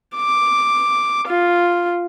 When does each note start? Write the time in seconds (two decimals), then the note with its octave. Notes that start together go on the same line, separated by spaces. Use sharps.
0.16 D6
1.27 F4